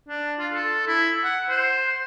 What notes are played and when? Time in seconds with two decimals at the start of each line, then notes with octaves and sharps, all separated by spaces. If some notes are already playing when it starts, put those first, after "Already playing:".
0.09 D4
0.39 F4
0.54 A4
0.87 E4
1.24 F#5
1.50 C5